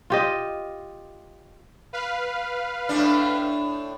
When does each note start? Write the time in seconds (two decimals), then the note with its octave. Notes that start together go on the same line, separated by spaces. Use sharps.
0.10 F4 G4 D#5
1.93 B4 F5
2.89 A2 D4